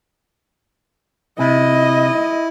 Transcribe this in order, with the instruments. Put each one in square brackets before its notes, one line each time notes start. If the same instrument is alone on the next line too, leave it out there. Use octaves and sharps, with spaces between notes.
[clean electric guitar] C3 [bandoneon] E4 [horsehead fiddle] D#5